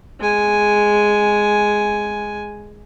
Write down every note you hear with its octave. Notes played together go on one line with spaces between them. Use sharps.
G#3 G#5